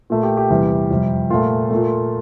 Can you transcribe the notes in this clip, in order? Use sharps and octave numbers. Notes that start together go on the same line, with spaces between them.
A#2 A3
G4
G4
E2 C3 G3
F2 C3 G3
A#2 F3 A3 F4
A#2 A3